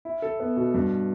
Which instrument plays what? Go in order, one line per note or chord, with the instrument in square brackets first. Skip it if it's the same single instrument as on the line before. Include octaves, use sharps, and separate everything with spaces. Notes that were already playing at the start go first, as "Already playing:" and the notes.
[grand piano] E4
A4
B3
B2
G2